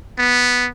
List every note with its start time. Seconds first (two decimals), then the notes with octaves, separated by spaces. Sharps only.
0.18 B3